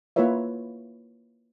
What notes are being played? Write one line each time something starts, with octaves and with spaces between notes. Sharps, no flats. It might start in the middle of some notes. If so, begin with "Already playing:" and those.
A#3 E4 F4 B4 C#5 E5